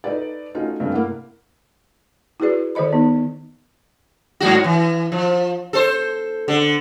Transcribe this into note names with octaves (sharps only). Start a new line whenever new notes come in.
D#4 A4 B4 D5
A3 C#4 D#4 F4 F#4
G2 C3 A3 C#4
A#3 E4 F#5
E4 F#4 G#4 B4 D5
D#3 A4 C5 D#5 B5
B3 D#4
G#2 F#3 F#4
E3
F3
A4 C5
D3